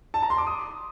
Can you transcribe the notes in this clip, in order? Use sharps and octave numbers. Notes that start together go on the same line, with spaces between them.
A5
A#5
C6
D6
D#6